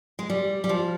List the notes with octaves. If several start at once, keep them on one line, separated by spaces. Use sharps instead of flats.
G#3
G3
G3
F3